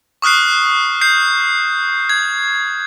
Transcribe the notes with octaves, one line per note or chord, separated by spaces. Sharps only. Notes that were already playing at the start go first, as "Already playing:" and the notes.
C#6 D#6 F6 F#6 C7
G6 C7
G#6